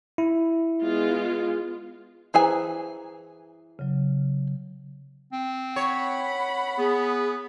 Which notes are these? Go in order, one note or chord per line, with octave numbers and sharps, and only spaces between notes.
E4
G#3 B3 F4
E3 G#4 B4 C5 G#5 A#5
C#3 F#3
C4
C#5 F#5 B5
B3 G#4